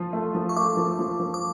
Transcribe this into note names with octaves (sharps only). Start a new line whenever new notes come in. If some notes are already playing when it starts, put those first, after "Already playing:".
Already playing: F3 F4
A3
F3
C#6
A3 D6
F3
F3
F3
D6